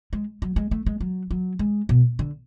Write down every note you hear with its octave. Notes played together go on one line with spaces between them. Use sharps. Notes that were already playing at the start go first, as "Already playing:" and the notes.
G#3
F#3
G#3
A3
G#3
F#3
F#3
G#3
B2
D3